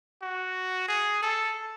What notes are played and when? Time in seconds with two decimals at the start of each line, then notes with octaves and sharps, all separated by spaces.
0.22 F#4
0.88 G#4
1.22 A4